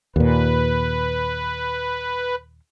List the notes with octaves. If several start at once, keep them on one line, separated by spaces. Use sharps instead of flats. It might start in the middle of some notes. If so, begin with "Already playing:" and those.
D#2 A#2 B4